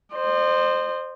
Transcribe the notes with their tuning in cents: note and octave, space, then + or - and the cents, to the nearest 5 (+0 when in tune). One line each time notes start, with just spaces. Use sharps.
C5 +0 D#5 -40